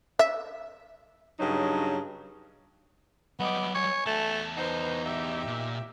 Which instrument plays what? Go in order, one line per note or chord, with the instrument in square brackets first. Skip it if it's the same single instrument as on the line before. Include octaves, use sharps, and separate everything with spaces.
[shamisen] E5
[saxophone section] G2 C#3 F#3 D#4
[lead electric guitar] F#3 G3 [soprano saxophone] B3 [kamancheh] D#5 D6
[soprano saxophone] C#5 [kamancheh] G#5
[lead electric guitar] E2 A5 [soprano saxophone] A3
[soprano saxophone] D#4 [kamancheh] B4 C5
[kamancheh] G4 E5
[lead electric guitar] A#2